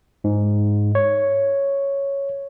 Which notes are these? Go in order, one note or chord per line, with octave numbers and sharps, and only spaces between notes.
G#2
C#5